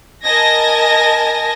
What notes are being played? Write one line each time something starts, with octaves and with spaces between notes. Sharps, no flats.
A#4 D#5 G#5 A5 G#6 A#6